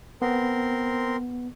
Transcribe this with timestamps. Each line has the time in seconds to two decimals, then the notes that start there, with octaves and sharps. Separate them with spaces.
0.22 B3 C4 A#4 C6